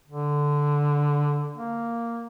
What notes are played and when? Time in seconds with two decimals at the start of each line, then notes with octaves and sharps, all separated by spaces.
0.08 D3
1.56 A#3